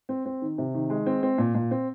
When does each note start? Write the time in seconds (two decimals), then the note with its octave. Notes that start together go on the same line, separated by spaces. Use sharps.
0.09 C4
0.26 C4
0.42 D#3
0.58 C3
0.75 D#3
0.90 G#3
1.06 C4
1.23 C4
1.38 A#2
1.55 A#2
1.71 C4